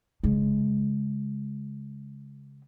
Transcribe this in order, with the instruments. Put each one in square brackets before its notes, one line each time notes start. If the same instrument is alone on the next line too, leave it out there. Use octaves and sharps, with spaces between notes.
[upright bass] C#3 G#3